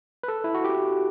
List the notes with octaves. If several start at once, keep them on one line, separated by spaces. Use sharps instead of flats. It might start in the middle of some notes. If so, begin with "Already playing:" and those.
B4
A4
E4
F#4
G4